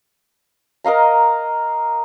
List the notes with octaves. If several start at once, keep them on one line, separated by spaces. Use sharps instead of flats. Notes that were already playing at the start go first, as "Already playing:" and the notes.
A#4 D#5 F5 A#5